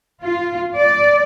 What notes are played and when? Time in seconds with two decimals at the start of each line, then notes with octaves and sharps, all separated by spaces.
0.24 F4
0.76 D5